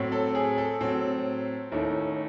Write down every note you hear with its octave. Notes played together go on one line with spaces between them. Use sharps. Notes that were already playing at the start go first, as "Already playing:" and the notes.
Already playing: A2 F#3 C4
A4
G#4
A4
A2 F#3 C4
D#2 D#3 A3 C#4 E4